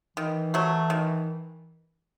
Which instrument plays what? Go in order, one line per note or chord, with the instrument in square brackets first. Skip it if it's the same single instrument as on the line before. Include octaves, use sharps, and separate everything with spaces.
[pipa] D#3 [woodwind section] E3
[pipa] F#3 A3
D#3